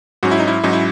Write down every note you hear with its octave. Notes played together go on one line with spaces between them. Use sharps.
G#2 F#3 C#4 F#4
E4
D#4
E4
G#2 F#3 C#4 D#4
E4